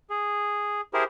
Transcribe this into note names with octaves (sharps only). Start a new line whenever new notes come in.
G#4
E4 G4 G#4 A#4 C5